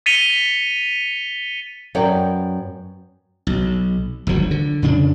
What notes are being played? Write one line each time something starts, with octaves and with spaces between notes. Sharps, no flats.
A6 B6 C#7 D#7 F7 G7
F#2 B3 C#5 D5 G5
B1
G1 D2 F3 F#3
D3
F2 C#3 D4